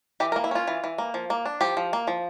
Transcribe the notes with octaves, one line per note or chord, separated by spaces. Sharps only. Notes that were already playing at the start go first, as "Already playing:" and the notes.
E3 G4
A#4
A#3
E4
C#4 F4
E3
E3
A#3
F3
A#3
D4
F3 G4
F3
A#3
F3